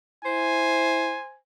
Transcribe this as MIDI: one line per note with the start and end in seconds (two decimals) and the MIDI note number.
0.25 1.18 64
0.25 1.36 72
0.25 1.38 80